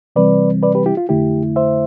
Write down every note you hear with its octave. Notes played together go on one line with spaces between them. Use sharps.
C3 E3 G3 C4 B4 D5
B4 D5
G4 B4
E4 G4
F4
F2 D3 A3 E4 G4
C5 E5